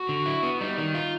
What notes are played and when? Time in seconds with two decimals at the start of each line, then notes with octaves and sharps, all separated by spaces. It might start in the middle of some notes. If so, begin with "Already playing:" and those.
Already playing: F#4
0.09 D3
0.26 E4
0.43 B3
0.61 G3 D#4
0.78 D#3
0.95 F4